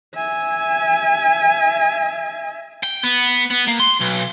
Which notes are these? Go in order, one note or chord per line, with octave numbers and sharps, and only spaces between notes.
E5 G#5
G5
B3
B3
A#3
C6
B1